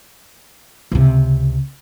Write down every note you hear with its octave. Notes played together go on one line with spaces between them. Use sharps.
C#2 C3